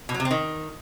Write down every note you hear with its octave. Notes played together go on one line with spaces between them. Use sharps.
B2
F#3
C3
C4
D#3